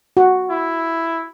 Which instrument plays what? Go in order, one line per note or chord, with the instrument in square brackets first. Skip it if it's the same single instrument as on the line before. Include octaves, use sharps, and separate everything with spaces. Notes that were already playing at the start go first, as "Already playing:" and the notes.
[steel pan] F#4
[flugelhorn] E4